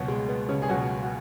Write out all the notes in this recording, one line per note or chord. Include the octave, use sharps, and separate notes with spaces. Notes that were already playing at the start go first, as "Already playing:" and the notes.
Already playing: C#2 B2 F#3
G#3
B3
C#3 C#4
G#4
C#2 B2 F#3 F#4
F#4